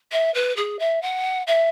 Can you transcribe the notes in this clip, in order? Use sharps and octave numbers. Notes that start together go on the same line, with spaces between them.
E5
B4
G#4
E5
F#5
E5